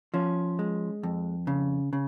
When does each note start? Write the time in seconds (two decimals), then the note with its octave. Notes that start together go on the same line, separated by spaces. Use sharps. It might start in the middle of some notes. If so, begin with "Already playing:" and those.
0.14 F3 C#4
0.59 G#3
1.03 F2
1.47 C#3
1.93 C#3